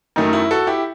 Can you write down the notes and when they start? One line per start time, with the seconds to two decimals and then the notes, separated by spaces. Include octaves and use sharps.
0.16 F#2 D#3 F#3 A3 D#4
0.33 E4
0.51 F#4 A4
0.67 E4 G4